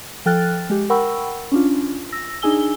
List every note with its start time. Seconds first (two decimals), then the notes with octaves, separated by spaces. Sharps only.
0.26 F3 A4 G5 F6 F#6 A6
0.70 G#3 G4
0.90 A#4 F#5 G5 B5 C#6 E6
1.52 C#4 D4 F4
2.12 E6 A#6
2.42 D4 D#4 G#4 G#5 E6 G7